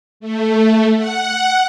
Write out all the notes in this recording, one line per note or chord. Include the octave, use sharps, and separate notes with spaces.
A3
F#5